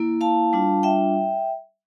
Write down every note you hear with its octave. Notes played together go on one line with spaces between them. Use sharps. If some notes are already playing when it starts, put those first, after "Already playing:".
Already playing: A#3 E4
F5 A5
G3 D4 F4
E5 G5